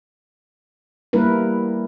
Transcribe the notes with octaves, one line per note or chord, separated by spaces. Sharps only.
G3 A#3 E4 A#4 B4